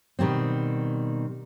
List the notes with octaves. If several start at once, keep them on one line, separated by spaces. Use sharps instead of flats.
B2 D#3 G3 C4